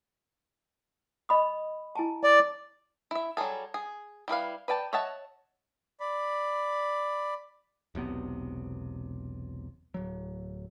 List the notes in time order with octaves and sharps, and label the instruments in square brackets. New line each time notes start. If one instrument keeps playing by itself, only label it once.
[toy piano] D#5 B5 D#6
E4 G#5 A5
[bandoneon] D5
[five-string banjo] E4 E5
F#3 G3 G#4 A4
G#4
G3 E4 B4 F5
B4 D5 G5 A5
C#5 D#5 E5 F#5 A5
[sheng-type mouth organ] D5 B5
[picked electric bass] E1 B1 C3 B3
D1 F#3